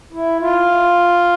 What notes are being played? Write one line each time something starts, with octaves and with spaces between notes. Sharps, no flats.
E4
F4